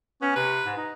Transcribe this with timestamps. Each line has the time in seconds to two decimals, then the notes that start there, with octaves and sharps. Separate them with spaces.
0.22 B3 C#4
0.36 C3 B4
0.65 G#2
0.77 D#4